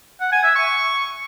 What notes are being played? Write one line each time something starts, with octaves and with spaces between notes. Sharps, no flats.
F#5
G#5
E5
C#6